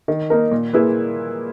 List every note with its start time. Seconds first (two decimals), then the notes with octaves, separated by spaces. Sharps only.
0.08 D#3
0.30 A#3 D#4 A#4
0.51 A#2
0.73 A#3 E4 G#4 B4